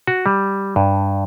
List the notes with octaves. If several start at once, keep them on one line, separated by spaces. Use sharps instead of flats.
F#4
G3
G2